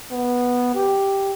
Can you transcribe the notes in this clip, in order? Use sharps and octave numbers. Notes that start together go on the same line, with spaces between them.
B3
G4